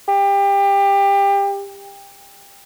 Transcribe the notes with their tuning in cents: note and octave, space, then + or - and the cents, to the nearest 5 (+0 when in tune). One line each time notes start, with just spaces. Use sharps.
G4 +25